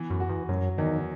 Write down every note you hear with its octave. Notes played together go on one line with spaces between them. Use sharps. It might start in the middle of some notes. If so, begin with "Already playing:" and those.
Already playing: E3 B3
F#2
F#4
E2
F#2 F#3
E2 D#3